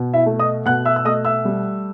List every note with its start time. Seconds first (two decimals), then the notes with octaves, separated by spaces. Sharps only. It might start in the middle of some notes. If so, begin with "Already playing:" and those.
Already playing: B2
0.14 E4 E5
0.26 A3
0.39 D#5 D#6
0.66 B2 F#5 F#6
0.85 E5 E6
0.96 E6
1.05 A3 D#5 D#6
1.25 E5 E6
1.45 G3